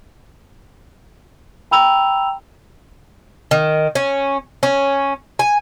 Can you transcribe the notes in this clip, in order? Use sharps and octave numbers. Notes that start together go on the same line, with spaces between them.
G5 A#5 B5 E6 F7
D#3
C#4
C#4
G#5